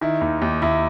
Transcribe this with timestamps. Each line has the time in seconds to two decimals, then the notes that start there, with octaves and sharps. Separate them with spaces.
0.01 D#3 E4
0.21 D#2
0.42 D#2
0.62 D#2 E4